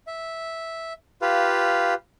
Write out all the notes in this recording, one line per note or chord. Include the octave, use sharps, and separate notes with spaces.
E5
F4 G4 B4 F5